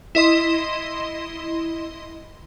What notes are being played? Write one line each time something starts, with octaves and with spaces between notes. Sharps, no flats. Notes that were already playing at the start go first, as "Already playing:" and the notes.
E4 D#5 C6